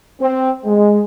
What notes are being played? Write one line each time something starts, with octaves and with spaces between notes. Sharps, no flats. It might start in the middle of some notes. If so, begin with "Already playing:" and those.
C4
G#3